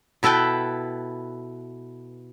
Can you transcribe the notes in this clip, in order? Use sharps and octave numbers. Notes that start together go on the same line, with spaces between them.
B2 E4 A4 B4 G5